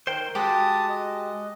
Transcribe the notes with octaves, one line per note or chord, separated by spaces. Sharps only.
D#3 A#4 C5 G5
G#3 F#4 G4 A5 D#6
D#5